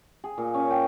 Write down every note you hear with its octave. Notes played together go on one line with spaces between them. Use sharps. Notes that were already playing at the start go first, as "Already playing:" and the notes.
G#4
A#2
C#4
G5